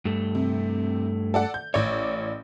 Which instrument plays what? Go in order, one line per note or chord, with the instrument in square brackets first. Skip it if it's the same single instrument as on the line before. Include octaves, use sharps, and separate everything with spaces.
[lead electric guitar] G2 A3
[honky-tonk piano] C3
A4 D5 F#5
G6
[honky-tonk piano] A1 D5 [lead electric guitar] C#5